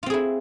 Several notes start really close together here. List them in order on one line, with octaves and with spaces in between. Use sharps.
F4 C4 G#4 E4